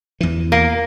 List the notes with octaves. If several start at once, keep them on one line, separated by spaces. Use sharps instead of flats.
E2 E3
A#3